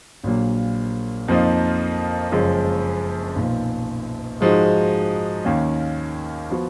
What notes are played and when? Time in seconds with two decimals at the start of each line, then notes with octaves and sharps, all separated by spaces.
0.24 A#1 A#2 F#3 A#3
1.28 F2 F3 A#3 D#4
2.32 F#1 F#2 F3 G#3 C#4
3.36 B1 A#2 F3
4.41 G#2 F3 G#3 D#4 F#4
5.45 D#2 D#3 A#3 C#4
6.50 F3 B3 F#4